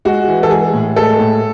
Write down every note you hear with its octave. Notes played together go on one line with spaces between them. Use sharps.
G#3 F#4
E3
A4
G#3 G#4
A2
G#3 A4
A2